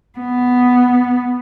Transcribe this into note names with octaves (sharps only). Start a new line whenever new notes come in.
B3